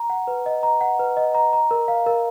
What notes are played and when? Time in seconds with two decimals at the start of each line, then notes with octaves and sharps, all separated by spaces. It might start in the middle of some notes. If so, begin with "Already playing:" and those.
Already playing: A#5
0.10 F#5
0.27 B4
0.46 D#5
0.63 A#5
0.81 F#5
0.99 B4
1.17 D#5
1.35 A#5
1.53 A#5
1.71 A#4
1.88 F5
2.06 A#4